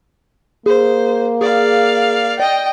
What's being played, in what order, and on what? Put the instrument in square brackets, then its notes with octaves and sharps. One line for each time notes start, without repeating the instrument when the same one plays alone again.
[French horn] A#3 [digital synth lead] G#4 [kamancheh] C5
[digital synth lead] G#4 [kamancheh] D5 F5
[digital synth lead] D5 [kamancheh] D#5 G5